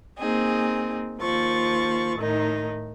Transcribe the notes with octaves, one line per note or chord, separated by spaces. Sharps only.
A#3 C4 D#4 G#4
D#2 F3 C#6 A6
A2 D#3 D#4